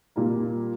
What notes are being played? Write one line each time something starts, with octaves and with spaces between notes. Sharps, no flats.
A#2 G3 A#3